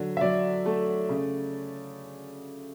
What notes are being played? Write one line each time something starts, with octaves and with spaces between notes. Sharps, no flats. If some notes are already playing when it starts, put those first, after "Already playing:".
Already playing: D3 F#3
E5
F#3 D5
A3
C#3